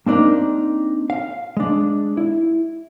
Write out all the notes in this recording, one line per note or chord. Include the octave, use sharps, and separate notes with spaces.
A#3 C4 D4 D#4 A#4
F5
G#3 D4
E4